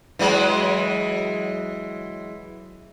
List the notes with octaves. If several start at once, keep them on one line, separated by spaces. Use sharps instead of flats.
E3 F#3 G#3